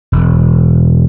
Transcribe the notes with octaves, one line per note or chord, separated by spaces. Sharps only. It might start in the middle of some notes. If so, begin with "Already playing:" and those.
E1